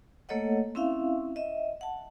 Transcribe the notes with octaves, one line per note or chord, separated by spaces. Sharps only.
A3 A#3 A4 C#5 D#5 F#5
C4 C#4 E4 E5 F5
D#5 E5
F#5 A5